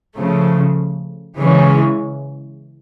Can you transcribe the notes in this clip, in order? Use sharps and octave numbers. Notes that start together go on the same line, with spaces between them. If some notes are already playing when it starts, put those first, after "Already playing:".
C#3 F3 A3
C#3 E3 G#3 C#4